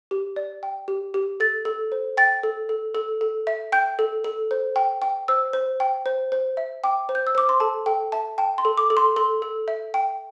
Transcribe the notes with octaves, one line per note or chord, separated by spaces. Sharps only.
G4
D5
G5
G4
G4
A4 A6
A4
C5
G5 A6
A4
A4
A4
A4
E5
G5 G6
A4
A4
C5
G5
G5
C5 E6
C5
G5
C5
C5
E5
G5 D6
C5
G6
E6
C5 D6
C6
A4 A5
A4 G5
E5 A5
G5 A5
C6
A4
D6
A4
C6
A4 C6
A4
E5
G5